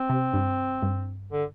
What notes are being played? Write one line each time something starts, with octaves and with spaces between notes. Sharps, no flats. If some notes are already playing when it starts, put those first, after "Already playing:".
Already playing: C4
C3
G2
G2
D3